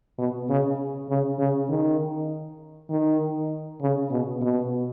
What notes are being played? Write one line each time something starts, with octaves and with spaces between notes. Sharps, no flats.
B2
C#3
C#3
C#3
D#3
D#3
C#3
B2
B2